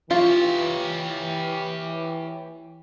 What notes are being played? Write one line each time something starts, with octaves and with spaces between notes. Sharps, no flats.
E3 F4 G4 C#5